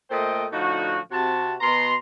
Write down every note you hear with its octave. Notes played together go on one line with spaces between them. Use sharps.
A#2 A3 A4 C5 D#5 G5
A2 D3 F3 D#4 F#4
C3 F#4 A5
B2 A#5 C6